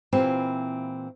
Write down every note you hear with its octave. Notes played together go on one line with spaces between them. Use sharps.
A#2 E3 C4 E4 F4 G4